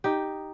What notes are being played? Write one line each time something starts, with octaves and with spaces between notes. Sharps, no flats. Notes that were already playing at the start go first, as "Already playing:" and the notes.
D#4 G4